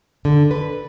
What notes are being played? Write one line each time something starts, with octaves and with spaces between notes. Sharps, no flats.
D3
B4